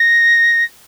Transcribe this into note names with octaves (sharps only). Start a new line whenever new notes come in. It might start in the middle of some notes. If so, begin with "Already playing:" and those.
Already playing: A#6